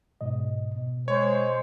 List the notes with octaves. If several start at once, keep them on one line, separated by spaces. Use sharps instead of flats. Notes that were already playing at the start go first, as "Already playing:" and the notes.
G#2 B2 D#5
B2
G#3 C5 C#5